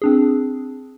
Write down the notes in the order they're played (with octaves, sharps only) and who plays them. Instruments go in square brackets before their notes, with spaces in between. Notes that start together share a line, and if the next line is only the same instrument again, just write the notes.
[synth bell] C4 D4 G#4